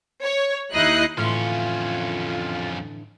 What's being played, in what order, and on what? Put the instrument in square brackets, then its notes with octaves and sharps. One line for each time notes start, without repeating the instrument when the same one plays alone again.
[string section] C#5
D#2 D#4 E4 D#5 F#6 C7
[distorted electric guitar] F2 C#4 [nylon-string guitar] A2 D3 E3 [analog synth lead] F4